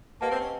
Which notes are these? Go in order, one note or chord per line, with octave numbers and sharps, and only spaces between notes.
A#3 G4 B4 D#5 F#5 A5
C4
C#4